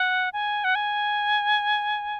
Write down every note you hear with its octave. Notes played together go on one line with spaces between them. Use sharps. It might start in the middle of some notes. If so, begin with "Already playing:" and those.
Already playing: F#5
G#5
F#5
G#5